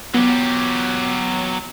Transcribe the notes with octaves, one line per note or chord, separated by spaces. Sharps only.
F#3 B3 G4